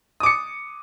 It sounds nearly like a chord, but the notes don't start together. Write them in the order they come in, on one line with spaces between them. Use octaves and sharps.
D#6 D6 C#7